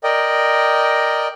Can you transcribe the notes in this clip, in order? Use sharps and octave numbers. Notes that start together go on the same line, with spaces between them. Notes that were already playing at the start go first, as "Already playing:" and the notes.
A#4 D5 D#5 G5